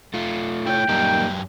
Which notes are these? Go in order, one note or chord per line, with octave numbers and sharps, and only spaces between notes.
A3 F4
E4 C#5 G5
F#2 G3 A#3 D#4 G4